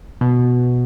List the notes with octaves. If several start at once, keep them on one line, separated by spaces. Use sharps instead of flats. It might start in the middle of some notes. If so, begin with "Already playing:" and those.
B2